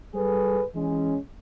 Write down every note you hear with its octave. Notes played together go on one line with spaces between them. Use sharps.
G3 G#4 A4 B4
E3 G#3 C#4